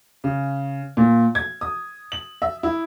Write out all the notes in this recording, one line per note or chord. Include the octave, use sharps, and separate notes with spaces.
C#3
A#2
G#6
D#6
F#7
E5
E4